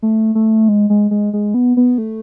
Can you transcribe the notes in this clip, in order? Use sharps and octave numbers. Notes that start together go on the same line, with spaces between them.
A3
A3
G#3
G#3
G#3
G#3
B3
B3
A3